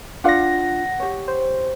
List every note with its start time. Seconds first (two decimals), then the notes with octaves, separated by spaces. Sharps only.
0.24 D4 F4 F5 F#5 A#6
0.99 G4 C#5
1.28 C5